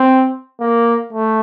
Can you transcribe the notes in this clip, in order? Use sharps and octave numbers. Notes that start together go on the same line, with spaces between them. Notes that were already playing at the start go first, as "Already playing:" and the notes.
Already playing: C4
A#3
A3